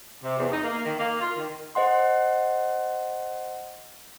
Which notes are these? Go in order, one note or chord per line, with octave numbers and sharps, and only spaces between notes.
C3
E2
D#4
A#3
D#3
A#3
F4
D#3
C5 D#5 F#5 C6